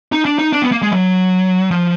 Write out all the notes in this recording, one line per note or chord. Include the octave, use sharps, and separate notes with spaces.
D#4
D4
D#4
D4
B3
A#3
G#3
F#3
F3